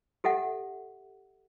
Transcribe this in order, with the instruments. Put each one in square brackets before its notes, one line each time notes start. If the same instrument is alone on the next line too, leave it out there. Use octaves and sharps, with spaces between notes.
[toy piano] G4 A4 E5 F#5